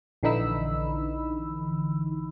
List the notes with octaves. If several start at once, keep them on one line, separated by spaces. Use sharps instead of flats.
A#1 D3 E3 D#4 B5 E6